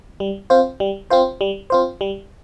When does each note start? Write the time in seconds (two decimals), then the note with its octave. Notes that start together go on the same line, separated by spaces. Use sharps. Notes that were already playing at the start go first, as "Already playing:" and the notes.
0.20 G3
0.50 C4 F4 C5
0.80 G3
1.10 C4 F4 C5
1.41 G3
1.70 C4 F4 C5
2.01 G3